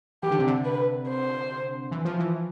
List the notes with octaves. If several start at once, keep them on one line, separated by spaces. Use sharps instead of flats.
E3 G4
D3
C3
D3
B4
C5
E3
F3
E3